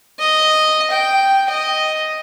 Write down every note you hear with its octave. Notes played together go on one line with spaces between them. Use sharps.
D#5
G5
D#5